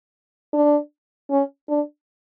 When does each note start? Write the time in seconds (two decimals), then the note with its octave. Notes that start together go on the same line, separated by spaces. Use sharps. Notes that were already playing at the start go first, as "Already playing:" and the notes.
0.53 D4
1.30 C#4
1.69 D4